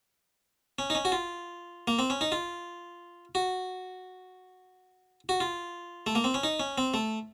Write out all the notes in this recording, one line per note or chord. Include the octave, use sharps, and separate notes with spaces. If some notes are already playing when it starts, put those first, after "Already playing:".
C#4
D#4
C#4
F#4
F4
A#3
C4
C#4
D#4
F4
F#4
F#4
F4
A3
A#3
C4
C#4
D#4
C#4
C4
A3